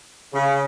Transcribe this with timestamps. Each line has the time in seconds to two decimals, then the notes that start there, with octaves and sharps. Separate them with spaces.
0.33 C#3